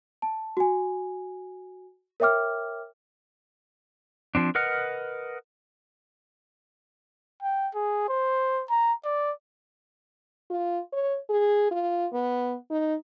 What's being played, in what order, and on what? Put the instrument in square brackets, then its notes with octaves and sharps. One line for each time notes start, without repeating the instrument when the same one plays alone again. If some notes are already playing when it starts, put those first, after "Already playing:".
[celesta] A5
F#4 G#5
A#4 C#5 E5 G5 D6 F6
[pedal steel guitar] F3 C4 D4
A#4 B4 D#5 F#5 F6
[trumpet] G5
G#4
C5
A#5
D5
[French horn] F4
C#5
G#4
F4
B3
D#4